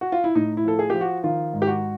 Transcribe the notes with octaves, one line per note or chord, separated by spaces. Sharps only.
F#4
F4
E4
A2 D#4
E4
F3 A4
G#4
F3 G4
F#4
D#3 F4
G#2
G4
F#4